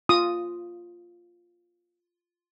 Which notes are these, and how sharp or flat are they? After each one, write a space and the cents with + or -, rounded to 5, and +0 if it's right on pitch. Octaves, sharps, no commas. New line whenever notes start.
F4 +0 D#6 +0